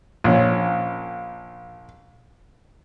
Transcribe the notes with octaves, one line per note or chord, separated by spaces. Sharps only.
A#1 C#4